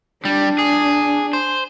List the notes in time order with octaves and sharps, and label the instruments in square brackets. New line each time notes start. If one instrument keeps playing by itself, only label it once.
[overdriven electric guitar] G3 [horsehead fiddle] D4
[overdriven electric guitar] G#4
C5